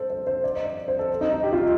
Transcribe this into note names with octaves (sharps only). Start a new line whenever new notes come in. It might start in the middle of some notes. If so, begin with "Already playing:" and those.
Already playing: A4 C5
C5
C5
D5
D#5
D5
C5
A4
D#4
D#4
G4
F4
D#4